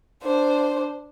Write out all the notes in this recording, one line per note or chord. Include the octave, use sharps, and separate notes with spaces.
D4 C5